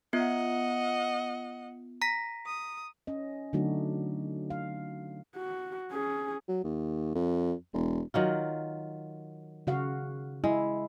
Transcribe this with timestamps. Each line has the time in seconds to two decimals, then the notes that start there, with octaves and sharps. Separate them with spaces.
0.13 B3 F4 D#5 F#5
2.02 A#5 A#6 B6
2.46 D#6
3.07 C#4 D#5
3.53 D3 F#3 A3 D4 D#4 F#4
4.50 F5
5.36 F#4
5.92 C#4 G#4
6.48 F#3
6.64 D#2
7.15 F2
7.74 E1
8.14 D#3 F#3 F4
9.67 C#3 F#4 F5
10.44 G#3 E4